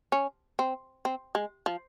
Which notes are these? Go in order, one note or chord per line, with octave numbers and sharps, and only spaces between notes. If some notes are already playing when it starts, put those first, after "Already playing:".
C#4
C4
C4
G#3
F3